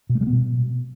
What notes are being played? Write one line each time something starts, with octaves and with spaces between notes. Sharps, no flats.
B2
A3
G3
B3
B2